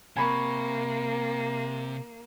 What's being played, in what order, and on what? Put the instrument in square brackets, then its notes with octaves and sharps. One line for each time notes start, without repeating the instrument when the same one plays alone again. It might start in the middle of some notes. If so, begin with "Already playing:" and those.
[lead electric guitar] C3 [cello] A#3 [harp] G#5 B5 C#6